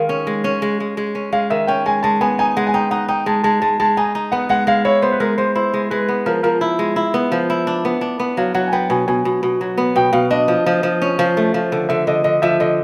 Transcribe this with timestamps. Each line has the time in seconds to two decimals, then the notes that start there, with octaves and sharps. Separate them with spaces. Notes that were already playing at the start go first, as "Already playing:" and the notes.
Already playing: D#3 G#3 F5
0.09 C#4
0.27 G#3
0.44 C#4
0.62 G#3
0.80 G#3
0.97 G#3
1.15 C#4
1.33 G#3 F5
1.50 D#3 E5
1.67 C#4 G5
1.86 G#3 G#5
2.03 G#3 A5
2.21 B3 G#5
2.39 D#4 G#5
2.57 G#3 F#5
2.67 G#5
2.74 D#4 G5
2.91 D#4 F#5
3.08 D#4 G5
3.26 G#3 A5
3.43 G#3 A5
3.62 G#3 A5
3.80 G#3 A5
3.97 D#4 G#5
4.15 D#4
4.32 B3 F#5
4.49 G#3 F#5
4.67 G#3 F5
4.85 E4 C#5
5.02 B3 C5
5.12 B4
5.20 G#3 A#4
5.38 G#3 C5
5.56 E4 C5
5.74 G#3
5.90 G#3 B4
6.09 B3
6.26 F3 A#4
6.43 F3 A#4
6.61 E4
6.79 G#3
6.96 E4
7.14 B3
7.32 F3
7.50 E4
7.67 D4
7.85 B3
8.01 D4
8.20 B3
8.37 F#3 F5
8.55 F#3 F#5
8.68 G#5
8.72 B3 G5
8.90 B2 G#5
9.08 B2 G#5
9.25 B2
9.43 B2
9.61 F#3
9.78 B3
9.96 B2 G5
10.13 B2 F5
10.30 D4 D#5
10.48 F3
10.66 F3
10.83 F3
11.02 C#4
11.19 F3
11.37 A3
11.54 F3
11.72 D3
11.89 D3 E5
12.07 D3 D#5
12.24 D3 D#5
12.42 F3 E5
12.60 D3 D#5